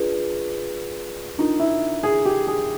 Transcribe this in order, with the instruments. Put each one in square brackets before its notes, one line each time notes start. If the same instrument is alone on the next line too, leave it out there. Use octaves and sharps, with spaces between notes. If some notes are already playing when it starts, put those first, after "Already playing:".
Already playing: [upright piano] D4 [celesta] F4 G#4 B4
[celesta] D4 F4 A#4 [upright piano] D#4
[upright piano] E4
G#4
G4
G#4